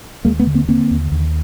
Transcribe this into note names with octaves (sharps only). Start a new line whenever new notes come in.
D#2 G#3 A#3
A3 B3
D3
A#3 C4
D3 A#3 C4
D#2
D#2